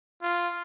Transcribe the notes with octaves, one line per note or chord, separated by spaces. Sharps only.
F4